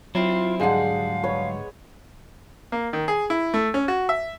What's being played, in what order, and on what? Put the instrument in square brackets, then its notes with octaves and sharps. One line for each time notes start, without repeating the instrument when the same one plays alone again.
[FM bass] F#3 [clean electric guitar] C4 E4 [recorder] F4
[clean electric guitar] D2 G#2 G3 [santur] G#3 D4 F#5 [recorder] F5
[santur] B4 C#5
[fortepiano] A#3
D#3
G#4
E4
A3
C#4
F#4
E5